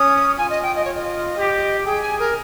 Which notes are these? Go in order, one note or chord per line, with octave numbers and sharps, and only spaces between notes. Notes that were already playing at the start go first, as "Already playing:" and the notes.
Already playing: C#4 D#6
F4 G#5
D#5
G5
D#5
C#5
D#5
G4
G#4 G5
G#5
A#4